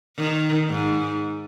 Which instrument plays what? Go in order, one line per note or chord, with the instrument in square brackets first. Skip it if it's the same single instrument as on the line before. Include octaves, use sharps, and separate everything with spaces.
[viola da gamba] D#3
G#2